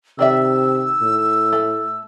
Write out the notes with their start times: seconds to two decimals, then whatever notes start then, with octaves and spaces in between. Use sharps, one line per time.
0.19 C3 D#3 D5 E5 E6
1.02 A2
1.53 A3